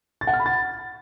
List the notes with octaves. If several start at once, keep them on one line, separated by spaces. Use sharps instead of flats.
A6
F#5
F6
B5
A6